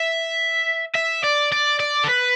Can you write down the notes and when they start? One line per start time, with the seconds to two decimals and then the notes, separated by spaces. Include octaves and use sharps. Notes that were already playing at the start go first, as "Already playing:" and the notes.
Already playing: E5
0.95 E5
1.24 D5
1.52 D5
1.80 D5
2.04 A4
2.09 B4